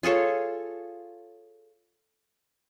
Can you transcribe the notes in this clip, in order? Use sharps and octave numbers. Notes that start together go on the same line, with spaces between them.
F4 G#4 A4 C#5